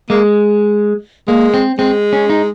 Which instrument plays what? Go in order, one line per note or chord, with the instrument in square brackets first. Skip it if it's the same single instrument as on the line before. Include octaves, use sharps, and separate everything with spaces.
[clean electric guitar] G#3 [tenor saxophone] A#3
[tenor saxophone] G#3 [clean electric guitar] A#3
[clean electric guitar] C4
[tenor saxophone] G#3 [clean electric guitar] C4
[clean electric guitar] C#4
D#4